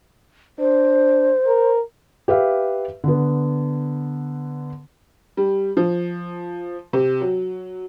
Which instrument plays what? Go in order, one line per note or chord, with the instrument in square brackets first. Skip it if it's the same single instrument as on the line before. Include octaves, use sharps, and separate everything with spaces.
[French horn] D4 [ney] C5
[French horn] A#4
[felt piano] G4 B4 E5 F5
D3 B3
[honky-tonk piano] G3
F3
C3
F#3